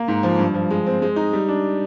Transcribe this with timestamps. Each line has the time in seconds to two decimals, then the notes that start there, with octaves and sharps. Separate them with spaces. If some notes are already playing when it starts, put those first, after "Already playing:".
Already playing: A#3
0.08 G#2
0.23 F3
0.39 G2
0.54 F3
0.70 G#3
0.86 C4
1.02 G#3
1.16 D#4
1.33 G3
1.49 D4